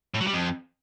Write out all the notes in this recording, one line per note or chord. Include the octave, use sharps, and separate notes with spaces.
A2
F#3
G3
F2